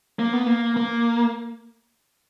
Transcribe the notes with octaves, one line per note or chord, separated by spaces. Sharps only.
A#3
B3
A#3
A#3